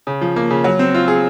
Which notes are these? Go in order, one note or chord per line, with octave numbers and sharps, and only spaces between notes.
C#3
F3
A#3
C#3
F#3
C4
F4
G#4